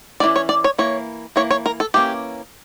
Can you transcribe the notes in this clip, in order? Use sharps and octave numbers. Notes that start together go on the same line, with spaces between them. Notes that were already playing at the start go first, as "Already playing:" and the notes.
E3 A#3 C#4 D5
C#5
D5
C#5
E3 A#3 C#5
E3 A#3 C#5
C#5
A#4
A4
E3 A#3 C#4 G4